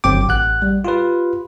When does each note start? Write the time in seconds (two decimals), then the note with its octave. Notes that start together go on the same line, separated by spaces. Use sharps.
0.04 G1 F#3 C4 G5 D6
0.28 A1 F#5 F#6
0.62 G3
0.85 F4 G4 B4